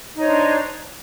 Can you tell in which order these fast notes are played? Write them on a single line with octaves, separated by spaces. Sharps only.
D#4 C#5 C5 D4